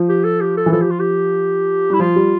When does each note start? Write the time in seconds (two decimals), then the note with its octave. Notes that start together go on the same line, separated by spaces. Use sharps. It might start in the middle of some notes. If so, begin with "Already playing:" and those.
Already playing: F3
0.09 G4
0.24 A4
0.41 G4
0.57 A4
0.66 E3
0.72 F3 A4
0.82 G4
0.90 F4
1.00 G4
1.90 G3 E4
2.00 F3 F4
2.16 G3